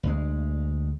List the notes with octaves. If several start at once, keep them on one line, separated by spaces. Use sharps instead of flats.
D2 G#3